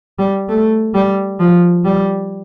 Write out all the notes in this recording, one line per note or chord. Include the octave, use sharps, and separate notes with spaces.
G3
A3
G3
F3
G3